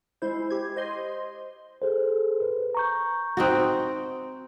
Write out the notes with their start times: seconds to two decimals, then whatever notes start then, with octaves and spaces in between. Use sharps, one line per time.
0.22 G#3 E4 C5
0.50 G4 G#6
0.76 C5 D#5 C6
1.82 G#4 A4 C5
2.40 B4
2.75 A#5 C#6 G6
3.37 C4 D#4 F#4